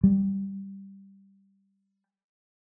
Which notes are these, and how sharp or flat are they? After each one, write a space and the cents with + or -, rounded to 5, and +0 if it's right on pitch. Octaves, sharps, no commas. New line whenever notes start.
G3 +0